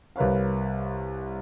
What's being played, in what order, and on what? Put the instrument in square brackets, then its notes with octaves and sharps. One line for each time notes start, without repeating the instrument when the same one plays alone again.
[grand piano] C2 A#4 B4 C#5 F5